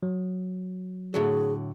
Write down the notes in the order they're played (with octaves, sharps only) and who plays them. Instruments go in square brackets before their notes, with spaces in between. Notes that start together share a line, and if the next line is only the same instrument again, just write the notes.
[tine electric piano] F#3
[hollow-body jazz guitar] A2 D3 F#3 [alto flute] G#4